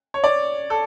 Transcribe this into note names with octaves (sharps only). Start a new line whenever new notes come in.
C#5
D5
A4